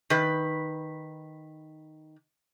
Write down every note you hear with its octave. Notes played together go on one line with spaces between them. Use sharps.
D#3 B4